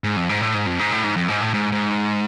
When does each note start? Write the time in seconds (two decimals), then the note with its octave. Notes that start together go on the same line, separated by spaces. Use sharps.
0.04 G#2
0.17 F2
0.29 G#2
0.41 A2
0.54 G#2
0.66 F2
0.79 G#2
0.91 A2
1.04 G#2
1.16 F2
1.28 G#2
1.41 A2
1.54 G#2
1.72 G#2